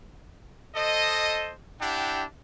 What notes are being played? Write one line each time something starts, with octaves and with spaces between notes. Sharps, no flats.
A4 C5 D#5
D4 E4 G4 F#5 G5